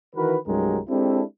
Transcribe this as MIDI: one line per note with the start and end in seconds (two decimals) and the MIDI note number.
0.15 0.36 51
0.15 0.36 52
0.15 0.36 66
0.15 0.36 70
0.15 0.36 71
0.46 0.79 36
0.46 0.79 43
0.46 0.79 54
0.46 0.79 56
0.46 0.79 67
0.46 0.79 70
0.89 1.22 56
0.89 1.22 60
0.89 1.22 62
0.89 1.22 64
0.89 1.22 67
0.89 1.22 69